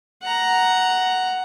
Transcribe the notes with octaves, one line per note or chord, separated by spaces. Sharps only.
F#5 A#5